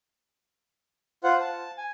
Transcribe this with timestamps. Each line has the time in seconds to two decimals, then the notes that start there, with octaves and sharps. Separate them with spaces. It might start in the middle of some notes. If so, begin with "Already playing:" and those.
1.24 F4 C5 F#5
1.40 A5
1.78 G#5